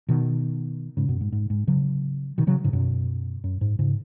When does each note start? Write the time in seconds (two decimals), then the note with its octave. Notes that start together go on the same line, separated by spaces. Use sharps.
0.09 B2 D#3
0.97 G#2 C#3
1.09 F#2 B2
1.21 G#2
1.32 G#2
1.50 G#2
1.67 C#3 F#3
2.38 B2 D#3
2.47 C#3 F#3
2.64 G#2 C#3
2.73 F#2 B2
3.44 F#2
3.61 G#2
3.79 G#2 C#3